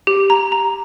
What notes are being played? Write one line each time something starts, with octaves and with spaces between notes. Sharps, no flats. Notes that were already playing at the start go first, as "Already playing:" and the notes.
G4
A#5
A#5